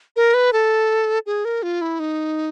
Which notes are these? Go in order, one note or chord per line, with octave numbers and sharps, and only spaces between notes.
A#4
B4
A4
G#4
A#4
F4
E4
D#4